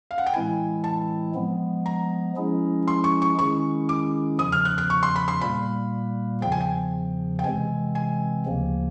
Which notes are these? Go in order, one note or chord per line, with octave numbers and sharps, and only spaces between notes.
F5
F#5
G5
A2 E3 G#3 C4 E4 G#5
A5
F3 G#3 B3
A#5
F3 G#3 C#4 E4 G#4
C6
C#6
C#6
D#3 G#3 C#4 E4 G#4 C#6
D6
E2 C#3 F3 D#6
F6
F#6
F#6
C#6
C6
B5
C6
A#2 G3 A#3 B5
E2 C#3 F3 G5
G#5
G5
G5
C3 E3 G#3 C4 G#5
G#5
D2 C#3 F3 A#3